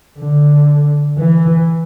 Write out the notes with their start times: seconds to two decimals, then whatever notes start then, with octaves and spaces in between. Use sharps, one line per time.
0.19 D3
1.17 E3